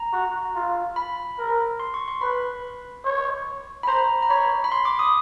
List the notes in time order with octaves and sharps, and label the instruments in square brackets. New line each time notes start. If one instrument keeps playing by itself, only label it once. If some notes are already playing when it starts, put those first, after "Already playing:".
Already playing: [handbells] A#5
[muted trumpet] F#4
F4
[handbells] B5
[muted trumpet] A#4
[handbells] C6
C#6
C6
[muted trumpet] B4 [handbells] B5
[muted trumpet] C#5
[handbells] B5
[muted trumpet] C5 [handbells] A#5
[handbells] A#5
[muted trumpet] C#5 [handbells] B5
[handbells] B5
C6
D6
D#6